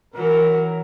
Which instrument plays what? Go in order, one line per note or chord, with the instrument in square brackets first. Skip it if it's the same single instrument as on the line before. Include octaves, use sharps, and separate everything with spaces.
[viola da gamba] E3 F#3 [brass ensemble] A#4